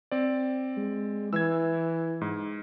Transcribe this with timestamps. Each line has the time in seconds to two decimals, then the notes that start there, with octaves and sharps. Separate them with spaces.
0.11 C4 D5
0.77 G#3
1.33 E3 E6 G#6
2.21 G#2